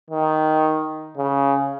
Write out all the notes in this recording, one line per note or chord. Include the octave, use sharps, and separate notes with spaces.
D#3
C#3